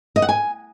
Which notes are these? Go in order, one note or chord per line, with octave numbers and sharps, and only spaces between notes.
D#5
F#5
G#5